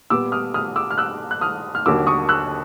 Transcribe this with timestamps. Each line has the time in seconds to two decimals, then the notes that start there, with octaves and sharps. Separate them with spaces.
0.10 A#2 G3 B3 D6 E6
0.32 D#6 F6
0.54 D#6 F6
0.76 D6 E6
0.91 F6
0.98 E6 F#6
1.31 F#6
1.41 D#6 F6
1.75 F6
1.86 D#2 D3 F#3 A#3 D6 E6
2.07 C#6 D#6
2.29 E6 F#6